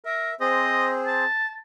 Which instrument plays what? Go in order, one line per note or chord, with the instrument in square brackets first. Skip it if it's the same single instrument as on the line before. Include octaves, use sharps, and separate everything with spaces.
[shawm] A#4 [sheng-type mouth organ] E5
[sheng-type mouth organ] C4 G#4 C5 [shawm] D#5
[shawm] A5